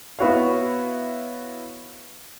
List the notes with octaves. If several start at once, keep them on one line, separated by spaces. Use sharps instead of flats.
B3 E4 F#4 C#5 F5